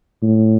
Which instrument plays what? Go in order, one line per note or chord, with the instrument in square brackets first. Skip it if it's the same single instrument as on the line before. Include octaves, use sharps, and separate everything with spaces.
[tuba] A2